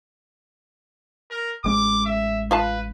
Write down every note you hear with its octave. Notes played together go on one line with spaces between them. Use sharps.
A#4
A1 G#3 C#4 D6
E5
F4 B4 F5 A5